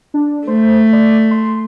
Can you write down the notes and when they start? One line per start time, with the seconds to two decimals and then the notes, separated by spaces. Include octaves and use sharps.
0.14 D4
0.47 A3 C5
0.93 D5
1.31 C6